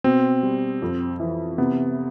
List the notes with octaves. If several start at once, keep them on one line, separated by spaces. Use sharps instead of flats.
B2 C4
G3
F2
E3
C3 B3